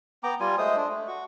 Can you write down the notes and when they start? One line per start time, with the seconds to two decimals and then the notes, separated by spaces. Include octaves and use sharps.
0.23 B3 G5 A#5 D6
0.40 G3 F4 G#5
0.58 G#3 A3 C5 D#6
0.77 D4
0.88 A3
1.08 F#4 C#6